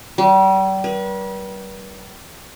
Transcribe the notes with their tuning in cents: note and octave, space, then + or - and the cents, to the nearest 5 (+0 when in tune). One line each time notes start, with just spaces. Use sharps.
G3 -35
B4 -40